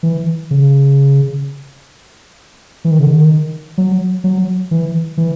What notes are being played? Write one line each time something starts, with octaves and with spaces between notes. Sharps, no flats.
E3
C#3
E3
D#3
C#3
D#3
F#3
F#3
E3
E3